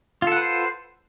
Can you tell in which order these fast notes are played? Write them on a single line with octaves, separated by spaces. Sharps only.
F4 A4 F#5 B4 C5